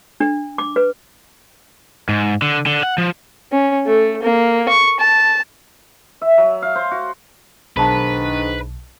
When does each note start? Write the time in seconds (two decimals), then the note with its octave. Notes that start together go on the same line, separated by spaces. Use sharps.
0.20 D4
0.58 D6
0.76 B4
2.09 G#2
2.42 D3
2.66 D3
2.83 F#5
2.98 F3
3.52 C#4
3.86 A3
4.23 A#3
4.69 C#6
5.00 A5
6.21 E5
6.38 F#3
6.62 F5
6.75 C5
6.91 F#4
7.77 B1 G#2 D#3 D4 B4 F5 A5 B5